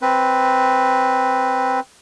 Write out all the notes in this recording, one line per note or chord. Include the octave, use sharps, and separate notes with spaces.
C4 B4